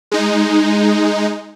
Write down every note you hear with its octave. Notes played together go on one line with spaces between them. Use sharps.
G#3 D#4